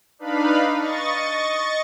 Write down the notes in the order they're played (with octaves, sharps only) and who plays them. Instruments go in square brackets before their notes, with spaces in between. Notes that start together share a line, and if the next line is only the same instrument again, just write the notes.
[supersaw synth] D4 D#4 B4 F5 B5
D#5 C#6 A6